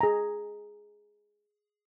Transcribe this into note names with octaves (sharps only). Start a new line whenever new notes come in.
G#4 A#5